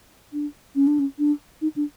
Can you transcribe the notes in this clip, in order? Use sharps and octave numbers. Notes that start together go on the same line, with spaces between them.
D4
C#4
D4
C#4
D4
D#4
D4